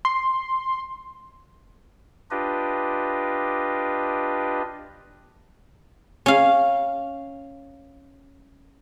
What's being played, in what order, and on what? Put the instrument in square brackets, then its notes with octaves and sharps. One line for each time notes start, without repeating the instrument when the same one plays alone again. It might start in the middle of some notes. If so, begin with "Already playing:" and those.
[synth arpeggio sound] C6
[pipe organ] D4 F4 G4 B4 D#5
[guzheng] C#4 F5